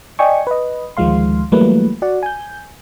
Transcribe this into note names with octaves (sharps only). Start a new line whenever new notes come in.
D5 D#5 G5 G#5 C#6
B4 D#5
D2 D#3 F3 G#3 F5 C6
E3 F#3 G3 A3 A#3 B4
F#4 D5 F#5
G#5 G6